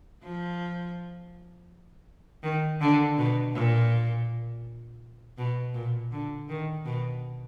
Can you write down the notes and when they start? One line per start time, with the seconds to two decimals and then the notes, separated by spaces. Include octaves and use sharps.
0.24 F3
2.43 D#3
2.81 D3
3.18 B2
3.54 A#2
5.38 B2
5.75 A#2
6.12 D3
6.49 D#3
6.85 B2